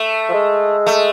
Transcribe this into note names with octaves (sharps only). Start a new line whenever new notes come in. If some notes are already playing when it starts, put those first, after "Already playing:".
Already playing: A3
F3
G#3
A3